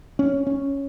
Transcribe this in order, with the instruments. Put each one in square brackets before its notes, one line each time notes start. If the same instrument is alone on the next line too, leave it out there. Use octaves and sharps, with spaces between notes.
[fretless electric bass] C#4
C#4